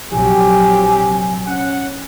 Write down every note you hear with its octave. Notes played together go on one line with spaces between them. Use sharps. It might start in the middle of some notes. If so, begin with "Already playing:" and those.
A#1 C3 F#3 G4 G#5
C#4 F#5